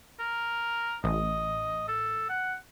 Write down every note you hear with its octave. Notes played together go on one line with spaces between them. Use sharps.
A#4
A1 D#5
A4
F#5